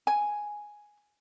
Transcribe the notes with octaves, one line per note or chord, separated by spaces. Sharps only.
G#5